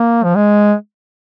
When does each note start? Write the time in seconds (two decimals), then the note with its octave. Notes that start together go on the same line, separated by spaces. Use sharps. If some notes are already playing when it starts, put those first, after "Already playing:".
Already playing: A#3
0.24 F3
0.36 G#3